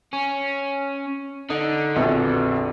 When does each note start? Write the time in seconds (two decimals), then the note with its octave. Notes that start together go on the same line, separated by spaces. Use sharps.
0.13 C#4
1.50 D3 D#4
1.96 A#1 F2 B2